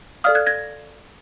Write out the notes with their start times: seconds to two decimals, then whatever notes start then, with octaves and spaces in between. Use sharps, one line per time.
0.24 A4 D5 F5 D#6 F6
0.35 F#6 G#6
0.46 G#6 A#6